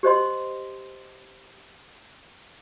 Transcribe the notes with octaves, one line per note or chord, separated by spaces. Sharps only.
G4 C5 D#5 C6